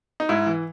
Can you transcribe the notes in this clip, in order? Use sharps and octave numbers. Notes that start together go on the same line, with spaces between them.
D#4
G#2 E4
E3